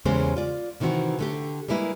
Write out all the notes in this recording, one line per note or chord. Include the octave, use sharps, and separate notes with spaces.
E2 C#3 G#3 A#3 G4 C5
F4 D5
C3 D#3 E3 C4 F#4
D3 A3 G4
G3 G#3 A#3 E4 B4